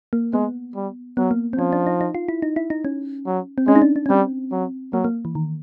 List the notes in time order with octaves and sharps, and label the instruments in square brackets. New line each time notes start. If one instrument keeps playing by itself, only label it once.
[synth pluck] A#3
[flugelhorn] G#3 [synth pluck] B3
[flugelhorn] G3
[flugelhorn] F#3 [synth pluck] B3
[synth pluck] A#3
C4
[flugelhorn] F3 [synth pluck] C#4
[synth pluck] D4
D#4
D#4
F4
E4
D#4
E4
D#4
C#4
[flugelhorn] F#3
[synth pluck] C4
[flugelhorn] G#3 [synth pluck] C#4
[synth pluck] D#4
D4
D4
C#4
[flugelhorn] G3 [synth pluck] C4
[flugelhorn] F#3
[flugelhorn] F#3 [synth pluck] A#3
[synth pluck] A#3
E3
D#3